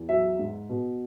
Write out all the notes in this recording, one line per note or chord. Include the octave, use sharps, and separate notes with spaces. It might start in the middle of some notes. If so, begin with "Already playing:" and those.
Already playing: E2
F#3 E5
G#2
B2